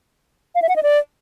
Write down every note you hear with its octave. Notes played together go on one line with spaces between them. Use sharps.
F5
E5
F#5
D#5
D5